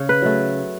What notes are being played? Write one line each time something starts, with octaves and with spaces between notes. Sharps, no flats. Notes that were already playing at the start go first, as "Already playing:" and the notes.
Already playing: C#3 C#5
B4
F#3 A3